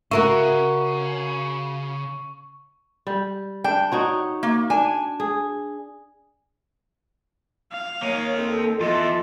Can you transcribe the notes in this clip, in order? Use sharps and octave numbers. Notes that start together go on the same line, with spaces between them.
C#3 F#4 A#4 E5 C#6
G3
D4 G5
D#4 F#4 C#5
A#3
D4 G#5
G#4
F5
A#3 C#5 D#5
C4 A4
E2 E3 F4 A4 D#5